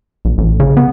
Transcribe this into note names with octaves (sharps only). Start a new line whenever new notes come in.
A#1
A1
C#3
B3